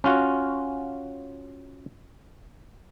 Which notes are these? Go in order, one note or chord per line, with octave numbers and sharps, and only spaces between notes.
C#4 F4 F#4